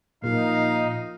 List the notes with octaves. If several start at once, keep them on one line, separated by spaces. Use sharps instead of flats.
A#2 F3 D#4 F4 A#4 F5